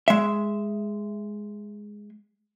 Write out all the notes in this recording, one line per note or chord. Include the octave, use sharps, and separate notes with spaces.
G#3 E5